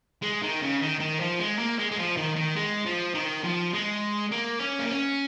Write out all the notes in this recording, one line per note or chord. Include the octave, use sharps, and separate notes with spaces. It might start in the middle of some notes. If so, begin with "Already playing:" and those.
G#3
D#3
C#3
D#3
D#3
F3
G#3
A#3
G#3
G#3
F3
D#3
D#3
G#3
F3
D#3
F3
G#3
A#3
C#4
A#3
C#4